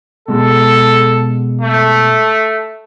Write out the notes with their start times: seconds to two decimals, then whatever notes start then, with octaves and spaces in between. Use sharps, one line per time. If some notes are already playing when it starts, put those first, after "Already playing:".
0.28 B2 G#3 A4
1.61 A3